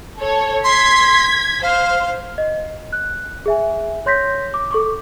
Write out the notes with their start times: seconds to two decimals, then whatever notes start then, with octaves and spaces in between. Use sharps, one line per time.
0.20 A4 C#5
0.64 C6 G#6 B6
1.63 C5 F5
2.38 D#5
2.93 F#6
3.46 G#4 E5 G#5
4.06 C#5 C6 G6 A#6 B6
4.54 D6
4.71 A4 C#6 D6